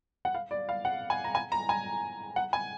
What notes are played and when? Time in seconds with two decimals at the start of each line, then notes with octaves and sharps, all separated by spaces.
0.25 F#5
0.35 F5
0.51 D5
0.69 F5
0.85 F#5
1.10 G#5
1.24 A#5
1.35 G#5
1.52 A#5
1.69 G#5
2.36 F#5
2.53 G#5